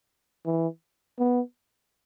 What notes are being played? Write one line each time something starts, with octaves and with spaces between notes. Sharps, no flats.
E3
B3